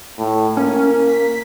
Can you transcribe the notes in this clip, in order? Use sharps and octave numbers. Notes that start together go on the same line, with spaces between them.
A2
A#3 C#4
B6